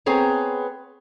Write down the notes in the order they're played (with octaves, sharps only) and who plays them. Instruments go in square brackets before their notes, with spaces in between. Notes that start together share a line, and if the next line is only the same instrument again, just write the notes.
[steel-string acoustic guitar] B3 C4 G#4 C#5 A#5